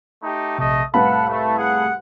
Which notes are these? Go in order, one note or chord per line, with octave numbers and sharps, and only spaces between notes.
A3 D#4 G4
A#1 C3 A3 D#5
C2 A2 A4 B4 F5 F#5 A5 B5
A3
G#4 F#5